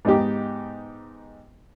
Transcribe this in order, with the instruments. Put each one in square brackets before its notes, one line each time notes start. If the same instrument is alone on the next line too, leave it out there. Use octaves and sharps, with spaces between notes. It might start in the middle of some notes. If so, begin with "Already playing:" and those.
[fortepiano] G#2 B3 D#4 G4